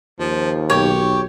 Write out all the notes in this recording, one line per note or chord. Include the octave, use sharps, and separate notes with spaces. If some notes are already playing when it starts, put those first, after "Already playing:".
D#2 F3
B1 G4 C#5